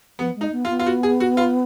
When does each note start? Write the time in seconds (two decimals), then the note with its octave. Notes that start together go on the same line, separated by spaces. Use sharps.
0.19 F3 B3
0.36 G#3
0.41 D#4
0.52 B3
0.65 F4
0.69 B3
0.79 F4
0.86 F#4
1.03 G#4
1.20 F#4
1.37 F4